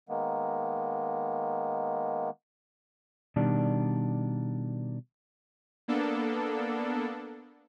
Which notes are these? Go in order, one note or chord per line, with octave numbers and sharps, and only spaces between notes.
D#3 G#3 A#3 B3
B2 D#3 G3 D4
A#3 B3 D4 A4